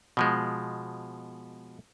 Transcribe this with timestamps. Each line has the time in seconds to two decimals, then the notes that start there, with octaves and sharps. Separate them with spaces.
0.17 B2 F3 G#3